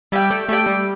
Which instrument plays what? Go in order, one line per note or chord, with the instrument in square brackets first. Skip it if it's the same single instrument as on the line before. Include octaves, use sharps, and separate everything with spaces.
[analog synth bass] G3 [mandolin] E4 G4 D5 G5
[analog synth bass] A3
[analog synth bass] A3 [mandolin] E4 G4 D5 G5
[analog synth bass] G3